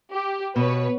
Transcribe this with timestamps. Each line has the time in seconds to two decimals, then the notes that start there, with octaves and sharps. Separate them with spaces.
0.12 G4
0.56 B2 B4 C#5